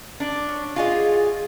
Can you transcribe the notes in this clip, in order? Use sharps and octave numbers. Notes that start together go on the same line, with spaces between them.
D4
C#4
F4 F#4 G#4 D#5